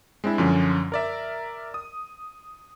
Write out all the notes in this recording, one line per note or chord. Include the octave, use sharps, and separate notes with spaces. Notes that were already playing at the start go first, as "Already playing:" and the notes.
G#3 C4 D4 E4
F#2 D3 F3 C#4
A#4 D5 E5
D#6